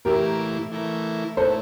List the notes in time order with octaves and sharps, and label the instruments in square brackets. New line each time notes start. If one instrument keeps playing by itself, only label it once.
[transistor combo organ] A2 E3 A#3 E4 [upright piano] G4 A#4
[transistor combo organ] E3 A3 E4 A#4
[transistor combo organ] A#2 A3 E4 [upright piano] A4 C5